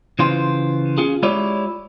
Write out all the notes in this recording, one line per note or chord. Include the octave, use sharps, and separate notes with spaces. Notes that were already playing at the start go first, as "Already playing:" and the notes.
C#3 E3 F4 C5
C#4 F4 G#4
G#3 E4 F4 G4 C#5 D5